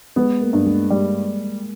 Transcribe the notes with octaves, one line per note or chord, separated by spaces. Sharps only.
G#3 B3
A#3
G2
G#3
G3